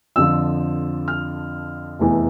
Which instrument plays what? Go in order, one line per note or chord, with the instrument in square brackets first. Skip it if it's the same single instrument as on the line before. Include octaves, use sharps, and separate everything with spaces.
[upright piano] F2 D3 F3 E6
F6
F1 E2 E3